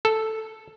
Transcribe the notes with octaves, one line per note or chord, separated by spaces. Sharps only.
A4